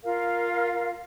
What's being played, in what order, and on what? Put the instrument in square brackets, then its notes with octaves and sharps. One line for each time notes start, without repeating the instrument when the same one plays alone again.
[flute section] F4 A#4 F5